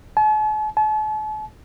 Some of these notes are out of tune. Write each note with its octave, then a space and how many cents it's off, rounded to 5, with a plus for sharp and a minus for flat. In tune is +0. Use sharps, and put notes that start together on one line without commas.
A5 -45
A5 -40